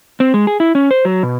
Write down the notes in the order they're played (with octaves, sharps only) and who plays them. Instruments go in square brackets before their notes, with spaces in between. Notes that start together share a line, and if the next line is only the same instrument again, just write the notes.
[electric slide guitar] C4
G#3
G#4
E4
C#4
C5
F#3
B2